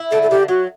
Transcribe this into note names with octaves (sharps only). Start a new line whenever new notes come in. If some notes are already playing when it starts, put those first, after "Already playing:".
Already playing: E4
D3 A4
A4
D3 G4
F#3 F#4